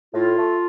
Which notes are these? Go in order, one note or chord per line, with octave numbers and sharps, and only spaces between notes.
A2 F4
A3